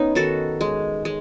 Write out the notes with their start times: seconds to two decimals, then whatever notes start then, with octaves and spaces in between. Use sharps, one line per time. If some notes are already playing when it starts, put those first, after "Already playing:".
Already playing: B3 C#4 D#4
0.15 D#3 F#4 A4
0.61 G#3
1.05 G#3